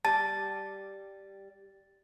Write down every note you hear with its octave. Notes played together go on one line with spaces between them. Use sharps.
G3 A5 A6